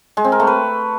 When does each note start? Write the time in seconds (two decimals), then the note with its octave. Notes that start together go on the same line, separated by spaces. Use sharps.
0.17 G#3
0.25 C4
0.32 A#4
0.40 A3
0.47 B4